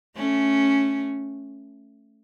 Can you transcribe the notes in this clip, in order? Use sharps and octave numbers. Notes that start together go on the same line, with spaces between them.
A3 C#4